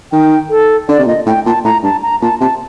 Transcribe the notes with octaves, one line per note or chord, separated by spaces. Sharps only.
D#3 G5
A4
D3 D5
C3
A#2 D#5
A2 G5
A#2 A5
A2 A#5
G2 A5
A#5
A#2 A5
C3 A5